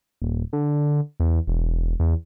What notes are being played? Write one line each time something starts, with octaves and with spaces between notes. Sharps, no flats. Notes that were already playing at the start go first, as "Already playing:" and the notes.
D#1
D3
E2
E1
E2